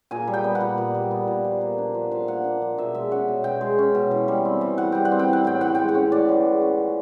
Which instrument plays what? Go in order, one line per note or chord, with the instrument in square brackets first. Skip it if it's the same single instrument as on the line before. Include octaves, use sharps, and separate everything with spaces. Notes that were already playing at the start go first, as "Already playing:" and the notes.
[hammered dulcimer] A#2 G#5
G3
G5
B3
F#5
A#2
A#2
G3
B3
A#2
F3
A#3
D4
F3
F3 F5
A#3 F#5
D4
F3
B2 E5
G#3 E5
C#4 F#5
B2
B2 G5
G#3
C#4
B2
E3
G3
C4
E3
E3 F#5
G3 G5
F#5
C4
G5
E3 F#5
A2 G5
E3 F#5
G#3 G5
F#5
C#4
A2 D5
E3
G#3
C#4
F3